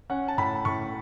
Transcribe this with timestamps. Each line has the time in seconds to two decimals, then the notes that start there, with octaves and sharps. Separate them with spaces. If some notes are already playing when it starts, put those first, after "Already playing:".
0.10 C#4 F#5
0.28 A5
0.38 A2 B5
0.65 A2 C#6